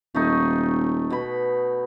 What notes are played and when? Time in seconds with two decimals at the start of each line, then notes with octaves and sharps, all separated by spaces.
0.15 D#1 A3 D#4
1.10 B2 B5